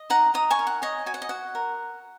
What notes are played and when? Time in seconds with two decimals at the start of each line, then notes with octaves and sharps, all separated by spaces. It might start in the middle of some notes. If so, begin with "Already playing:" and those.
Already playing: D#5
0.10 D#4 F#5 A#5
0.34 D#4 A#5 D#6
0.50 G#5 C#6
0.59 A#4
0.67 F#5
0.82 C#5 D#5 G#5
1.06 F#4 G#5
1.14 F#5
1.22 D#5
1.29 F#4 F#5
1.55 A#4